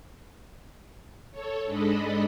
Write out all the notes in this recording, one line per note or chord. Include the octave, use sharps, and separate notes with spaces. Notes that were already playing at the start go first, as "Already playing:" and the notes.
A4 C#5
G#2 G#3 D4 A4 D#5 B5